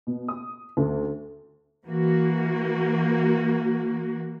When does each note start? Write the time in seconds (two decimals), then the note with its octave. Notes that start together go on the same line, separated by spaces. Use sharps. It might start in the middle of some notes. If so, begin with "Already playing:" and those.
0.07 B2
0.28 D#6
0.77 D2
1.85 E3 A#3 F#4